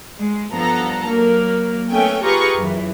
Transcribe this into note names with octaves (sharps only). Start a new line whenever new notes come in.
G#3
G2 F3 B3 A4 A#5
F#3 A#3
A3 B3 C#4 G5 G#5
F4 G4 G#4 B4 A#5 C#6
F#2 E3